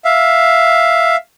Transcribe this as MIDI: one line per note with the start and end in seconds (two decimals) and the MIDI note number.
0.05 1.16 76
0.05 1.16 77